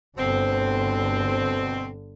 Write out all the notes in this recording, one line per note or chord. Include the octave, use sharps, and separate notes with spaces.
G1 B2 D3 C4